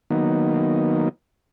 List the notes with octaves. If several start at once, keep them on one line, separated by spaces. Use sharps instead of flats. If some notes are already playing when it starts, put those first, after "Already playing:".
D#3 F#3 A#3 B3 D#4